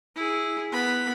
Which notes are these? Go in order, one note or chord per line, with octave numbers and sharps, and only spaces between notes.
E4 G#4
B3 B5